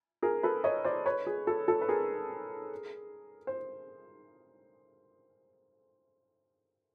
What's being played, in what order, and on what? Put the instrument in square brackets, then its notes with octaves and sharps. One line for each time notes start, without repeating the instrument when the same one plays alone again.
[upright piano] G#4 A#4
A4 B4
C#5 D#5
C5 D5
B4 C#5
G#4
A4
A4
B4
G#4 A#4
C5